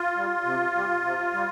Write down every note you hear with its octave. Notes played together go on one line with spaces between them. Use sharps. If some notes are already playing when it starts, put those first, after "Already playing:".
Already playing: F4
G3
C3
G3
C3
G3